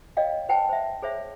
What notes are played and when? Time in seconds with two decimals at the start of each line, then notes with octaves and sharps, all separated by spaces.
0.17 C#5 D#5 F5 G5
0.49 B4 C5 F#5 G5 A5
0.69 C5 E5
1.02 G#4 C5 C#5 E5